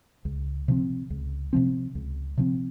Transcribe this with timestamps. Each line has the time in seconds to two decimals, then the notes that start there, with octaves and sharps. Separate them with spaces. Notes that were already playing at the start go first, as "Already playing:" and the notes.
0.25 C#2
0.68 C3 F3 C4
1.10 C#2
1.53 C3 F3 C4
1.95 C#2
2.37 C3 F3 C4